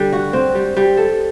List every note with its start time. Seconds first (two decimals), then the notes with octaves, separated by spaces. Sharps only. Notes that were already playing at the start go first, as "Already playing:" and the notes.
Already playing: D3 G3 D4
0.12 F#4
0.33 C4
0.55 G3
0.77 G3
0.97 A4